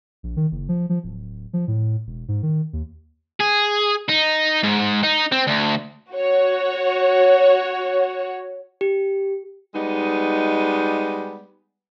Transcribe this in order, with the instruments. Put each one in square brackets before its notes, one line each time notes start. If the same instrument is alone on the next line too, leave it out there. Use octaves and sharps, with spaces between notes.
[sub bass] A#1
D#3
F#1
F3
F3
D1
F3
A2
E1
G#2
D#3
D#2
[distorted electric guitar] G#4
D#4
G#2
D#4
C4
D2
[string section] F#4 C#5
[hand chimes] G4
[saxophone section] G3 G#3 B3 D#4